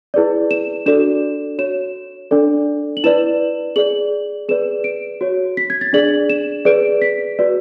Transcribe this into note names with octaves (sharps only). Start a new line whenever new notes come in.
E4 G#4 B4 D5
E7
D4 F#4 A4 D5 E7
F#4 C#5 E7
D4 A4 D5
F#7
E4 B4 D5 E7
G#4 D5 F#7
G#4 B4 D5 E7
D7
F#4 C#5
B6
G#6
A6
D4 G#4 D5 F#7
E7
G#4 B4 D5 D7
B6
F#4 B4 D5